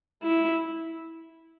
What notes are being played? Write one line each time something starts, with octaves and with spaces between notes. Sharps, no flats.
E4